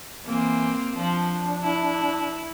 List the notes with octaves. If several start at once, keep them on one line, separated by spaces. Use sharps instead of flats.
E3 A#3 C4
F3 D4
E4